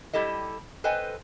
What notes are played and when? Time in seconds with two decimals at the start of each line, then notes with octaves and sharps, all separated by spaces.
0.13 G3 E4 G4 A4 D#5
0.84 A4 B4 C5 D#5 G5 G#5